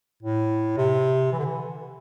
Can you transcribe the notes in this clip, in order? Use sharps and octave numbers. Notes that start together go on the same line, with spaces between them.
A2
C3
E3
D3
E3